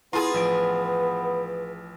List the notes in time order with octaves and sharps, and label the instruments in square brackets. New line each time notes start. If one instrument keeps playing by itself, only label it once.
[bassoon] B3 [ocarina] E4 [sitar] F4 G#4 [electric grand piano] A#5 C6
[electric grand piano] A1 F3 D7 [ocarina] B4